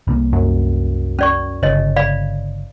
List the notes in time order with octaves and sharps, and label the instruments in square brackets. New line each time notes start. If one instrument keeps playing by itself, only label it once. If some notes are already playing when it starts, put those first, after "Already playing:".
[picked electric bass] C2 C3 A#3
[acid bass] F#2
[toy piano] C#4 D5 C#6
[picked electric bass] G1 C#3 [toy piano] C#5 D#5
[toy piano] D5 F5 B5